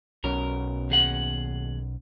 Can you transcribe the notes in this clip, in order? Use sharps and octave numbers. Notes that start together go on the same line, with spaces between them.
B1 B2 C#4 A#4
D#2 G#4 F#5